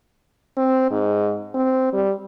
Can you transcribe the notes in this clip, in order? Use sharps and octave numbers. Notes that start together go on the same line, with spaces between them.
C4
G#2
C4
G3